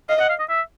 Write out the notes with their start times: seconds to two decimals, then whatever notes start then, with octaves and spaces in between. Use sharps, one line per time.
0.09 D#5 F5
0.20 F#5
0.29 F5
0.39 D#5
0.49 E5